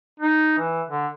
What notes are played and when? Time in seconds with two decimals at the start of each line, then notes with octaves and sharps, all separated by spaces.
0.19 D#4
0.59 E3
0.89 D3